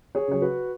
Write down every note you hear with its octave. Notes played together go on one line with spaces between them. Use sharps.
G#4 C#5
C#3 F#3 C#5
F#4 B4